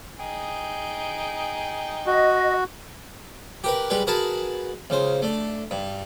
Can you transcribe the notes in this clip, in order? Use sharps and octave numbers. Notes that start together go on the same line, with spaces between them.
D#4 G#4 G5
F#4 D#5
G4 A#4 B4
G3 G#3 G4 B4
F#4 G#4 A#4 B4 A5
C#2 C#3 C5
A3 D4
G2